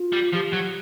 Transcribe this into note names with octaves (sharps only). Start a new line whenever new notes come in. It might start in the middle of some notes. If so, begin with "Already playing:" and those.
Already playing: F4
G3
F3 G4
F#3